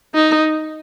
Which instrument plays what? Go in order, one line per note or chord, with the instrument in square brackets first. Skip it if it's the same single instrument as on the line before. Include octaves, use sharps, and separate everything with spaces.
[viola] D#4